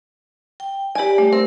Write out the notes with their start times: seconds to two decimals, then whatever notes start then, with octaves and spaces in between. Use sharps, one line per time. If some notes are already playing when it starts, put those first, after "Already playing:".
0.60 G5
0.95 G4 D5 G#5 B5
1.18 G3 A3
1.33 C4 A#4